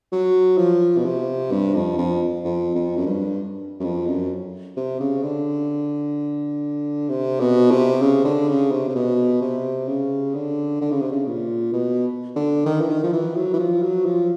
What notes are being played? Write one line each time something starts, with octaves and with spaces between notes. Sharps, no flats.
F#3
F3
B2
C3
G2
F2
F2
F2
F2
F#2
G2
F#2
F2
F#2
C3
C#3
D3
C3
B2
C3
C#3
D3
C#3
C3
C3
B2
C3
C#3
D3
D3
C#3
C3
C#3
A#2
B2
D3
D#3
E3
D#3
F3
E3
F#3
E3
F3
F#3
F3